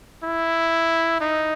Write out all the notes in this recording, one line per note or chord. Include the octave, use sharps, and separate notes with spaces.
E4
D#4